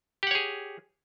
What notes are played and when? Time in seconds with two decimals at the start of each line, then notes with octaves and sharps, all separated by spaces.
0.23 G4
0.27 F#5
0.31 C#5
0.35 G#4